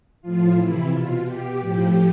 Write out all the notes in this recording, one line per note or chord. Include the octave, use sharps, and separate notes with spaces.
A2 F3 F4
C3 E3 E4
B2 F4
B2 G4
A2 F3 G4